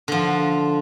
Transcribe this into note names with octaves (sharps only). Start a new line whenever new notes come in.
D3 F3